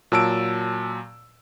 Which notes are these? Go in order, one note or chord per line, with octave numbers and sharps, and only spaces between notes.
A#2 F#3 A5 E6 D7